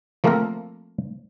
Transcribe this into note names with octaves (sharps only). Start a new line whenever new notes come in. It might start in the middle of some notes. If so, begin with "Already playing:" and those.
F3 A3 A#3 C4 A4 A#4